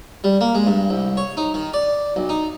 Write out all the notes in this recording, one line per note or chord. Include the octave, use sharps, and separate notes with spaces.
G3
A#3
G#3
G2
C2
C#5
D#4
D#3
D5
B1
D#4